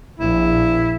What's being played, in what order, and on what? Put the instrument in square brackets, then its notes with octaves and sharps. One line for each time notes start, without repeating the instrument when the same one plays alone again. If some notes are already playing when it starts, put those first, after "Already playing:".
[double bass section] A#1 [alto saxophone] E4